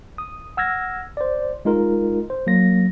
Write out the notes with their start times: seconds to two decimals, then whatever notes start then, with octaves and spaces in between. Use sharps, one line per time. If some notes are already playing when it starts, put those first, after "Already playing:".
0.18 D#6
0.57 F#5 E6 F6 G#6 A#6
1.17 C5 D5
1.65 G#3 D#4 F4 A#4
2.30 C5
2.47 F#3 A#3 A#6